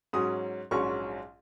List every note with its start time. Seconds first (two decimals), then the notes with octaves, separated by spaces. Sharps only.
0.13 G#2 F#3 C#4 D#6
0.71 A#1 G#2 F#3 C#4 C#6